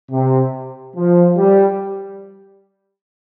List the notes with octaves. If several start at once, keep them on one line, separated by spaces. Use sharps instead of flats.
C3
F3
G3